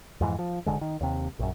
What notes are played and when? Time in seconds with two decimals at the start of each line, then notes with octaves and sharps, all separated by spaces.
0.21 F2 G#2 E3
0.39 F3
0.66 F#1 D2 D3 G#3
0.81 D#3
1.01 D#2 C3
1.39 A#1 F#2